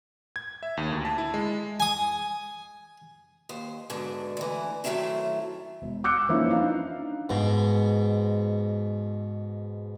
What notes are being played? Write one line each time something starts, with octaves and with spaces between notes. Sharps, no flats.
G#6
E5
D#2
D2
A5
E4
G#3
G#5 D#6
D#2 C5
G#2 B2 D3
D2 E3
F#2 D#3 F#3 A3 C4 E4
E1
D6 E6 F#6 G6 C#7
E3 F3 A#3 C#4 D#4 E4
D4 D#4 F5
G#2 B2